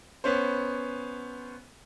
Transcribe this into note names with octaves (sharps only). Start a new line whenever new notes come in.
B3 C#4 C5